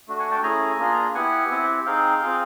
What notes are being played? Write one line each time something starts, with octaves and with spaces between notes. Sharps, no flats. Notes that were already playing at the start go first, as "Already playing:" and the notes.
A3 D4 F#4
F#5 G#5
G5 A5
A3 C#4 E4 G#4 G#5 A#5
A#3 D4 F4 G#4
B3 E4 G4 F#5 G#5
C4 E4 G4
C4 D#4 G#4 F5 G5
C4 F4 G#4